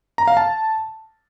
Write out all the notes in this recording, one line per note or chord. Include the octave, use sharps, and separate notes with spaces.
A#5
F5
A5